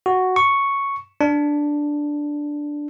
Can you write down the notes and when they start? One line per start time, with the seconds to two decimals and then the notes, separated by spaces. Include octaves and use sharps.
0.06 F#4
0.36 C#6
1.21 D4